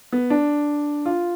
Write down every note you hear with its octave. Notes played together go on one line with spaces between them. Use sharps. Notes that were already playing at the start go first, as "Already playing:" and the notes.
B3
D4
F4